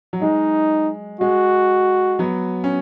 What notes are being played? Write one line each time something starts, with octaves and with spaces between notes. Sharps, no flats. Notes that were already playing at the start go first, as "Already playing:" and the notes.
F#3
G#3 D#4
G#3 F#4
F#3 B3
C#4